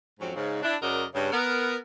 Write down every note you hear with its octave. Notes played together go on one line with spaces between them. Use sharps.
F2 G#2 F3 F#3 C4 C#4
G#2 C#3
D4 E4
F#2 C#3 F#4 A#4 D5 D#5
G2 C#3 C#4
B3 A#4